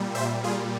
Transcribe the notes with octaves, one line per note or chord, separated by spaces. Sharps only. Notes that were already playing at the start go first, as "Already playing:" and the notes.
Already playing: A#2 G3
C5 E5
F4 G#4